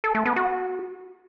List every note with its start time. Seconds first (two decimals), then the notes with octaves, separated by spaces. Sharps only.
0.04 A4
0.15 A3
0.25 B3
0.36 F#4